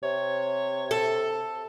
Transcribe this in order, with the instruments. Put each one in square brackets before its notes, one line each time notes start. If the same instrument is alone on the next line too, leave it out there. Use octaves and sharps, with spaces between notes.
[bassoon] C3 [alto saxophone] C#5
[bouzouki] A4